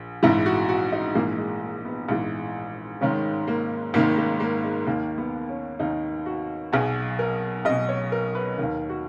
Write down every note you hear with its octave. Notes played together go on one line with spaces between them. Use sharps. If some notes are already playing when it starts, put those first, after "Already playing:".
Already playing: A#1
A#1 G#2 E3 E4
F#4
F#4
D#4
A#1 G#2 E3 A#3
G#3
A#3
B3
A#1 G#2 E3
G#1 G#2 D#3 C#4
A#3
G#1 G#2 D#3 A#3
A#3
A#3
G#3
D#2 D#3 A#3
B3
C#4
D#2 D#3 D#4
F#4
B1 B2 G#4
A#4
B1 B2 D#5
C#5
A#4
B4
D#2 D#3 A#4
F#4